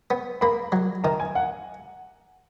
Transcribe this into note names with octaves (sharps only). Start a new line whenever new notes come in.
B3
A#3 B5
F#3
D#3 A#5
G#5
F#5